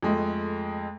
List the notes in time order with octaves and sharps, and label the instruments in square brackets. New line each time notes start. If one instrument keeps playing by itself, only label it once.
[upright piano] F2 G#3 A3